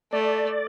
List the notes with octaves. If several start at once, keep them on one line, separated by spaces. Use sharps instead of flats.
A3 D5